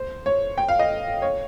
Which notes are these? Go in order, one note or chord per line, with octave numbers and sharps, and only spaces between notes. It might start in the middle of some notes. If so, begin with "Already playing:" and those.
Already playing: C5
C#5
G5
F5
D#5
C#5